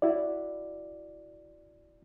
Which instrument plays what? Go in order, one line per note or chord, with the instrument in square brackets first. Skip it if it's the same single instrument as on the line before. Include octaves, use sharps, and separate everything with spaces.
[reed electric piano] E4 F#4 D5